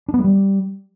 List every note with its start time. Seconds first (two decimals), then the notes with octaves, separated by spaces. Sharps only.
0.08 D4
0.14 B3
0.19 G#3
0.24 G3